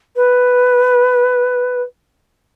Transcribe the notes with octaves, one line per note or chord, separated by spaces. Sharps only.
B4